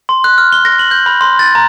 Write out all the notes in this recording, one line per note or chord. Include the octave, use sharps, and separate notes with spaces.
C6
F#6
F6
G7
A#6
F#7
G6
B5
C6
A6
A#5